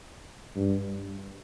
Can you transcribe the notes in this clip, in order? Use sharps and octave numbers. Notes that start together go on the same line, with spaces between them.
G2